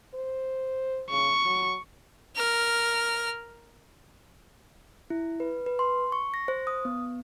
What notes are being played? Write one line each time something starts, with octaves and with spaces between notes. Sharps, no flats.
C5
C#3 C#6
F#3
A#4 F6
E4
B4
B4
C6
C#6
A#6
C5
D#6
B3